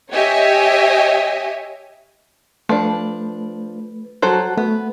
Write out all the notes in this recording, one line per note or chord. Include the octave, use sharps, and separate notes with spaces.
G4 C#5 D#5 E5 G#5
F3 A3 D4 B4
F#3 F#4 A4 C5 A5 F#6
A3 B3